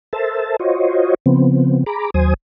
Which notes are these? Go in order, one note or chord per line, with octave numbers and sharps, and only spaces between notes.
A4 A#4 C5 E5 A5
F4 F#4 C5 C#5 D#5
C#3 F3 B3 C4
G#4 A#5 B5 D6
D#2 F#3 C5 G#5 D#6